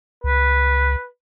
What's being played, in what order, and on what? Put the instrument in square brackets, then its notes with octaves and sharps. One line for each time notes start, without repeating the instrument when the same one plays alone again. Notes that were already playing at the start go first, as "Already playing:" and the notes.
[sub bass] C#2 [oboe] B4